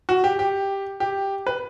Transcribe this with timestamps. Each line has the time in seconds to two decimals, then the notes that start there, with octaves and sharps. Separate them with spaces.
0.09 F#4
0.24 G4
0.39 G4
1.00 G4
1.47 B4